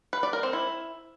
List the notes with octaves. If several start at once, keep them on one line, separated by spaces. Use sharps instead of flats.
B4
D5
A#4
C4
E4